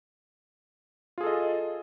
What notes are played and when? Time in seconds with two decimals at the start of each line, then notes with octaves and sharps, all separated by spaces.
1.18 F4
1.21 G#4
1.24 A4
1.27 D#5